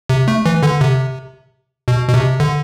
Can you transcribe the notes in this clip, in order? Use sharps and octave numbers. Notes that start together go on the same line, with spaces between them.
C3
A3
E3
D3
C3
B2
B2
C3
D3